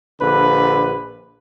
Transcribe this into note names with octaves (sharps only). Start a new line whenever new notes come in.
A#1 D3 B4